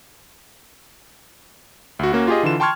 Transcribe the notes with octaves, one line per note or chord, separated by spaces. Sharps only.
D2 F#4
A#3 C#4 F#4
F4 G4 G#4 D#5
D3 E3 F4 E7
G5 A5 C6 C#6 F6 G#6